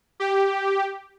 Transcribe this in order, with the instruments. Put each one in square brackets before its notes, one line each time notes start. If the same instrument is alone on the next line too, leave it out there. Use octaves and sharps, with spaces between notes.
[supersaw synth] G4